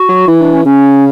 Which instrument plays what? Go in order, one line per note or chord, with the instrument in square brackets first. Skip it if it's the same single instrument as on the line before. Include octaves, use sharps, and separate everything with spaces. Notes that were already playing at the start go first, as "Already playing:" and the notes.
Already playing: [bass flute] F#4
[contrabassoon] F#3
[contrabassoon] E3 [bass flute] E4
[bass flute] D4
C#4
[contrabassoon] C#3 [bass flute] C#4